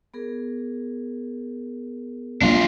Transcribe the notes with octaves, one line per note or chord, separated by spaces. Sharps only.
B3 G#4 A#4
F#3 A#3 B3 D4 F4 E5 G#5